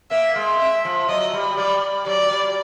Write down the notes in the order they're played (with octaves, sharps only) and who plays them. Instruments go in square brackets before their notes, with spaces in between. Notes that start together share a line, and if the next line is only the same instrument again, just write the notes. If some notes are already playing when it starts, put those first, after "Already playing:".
[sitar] A#3 [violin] E5
[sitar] G#3
[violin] E5
[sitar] F3
[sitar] F#3 [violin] D#5
[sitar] G3
[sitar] G3 [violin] D5
[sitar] F#3 [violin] D5
[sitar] G3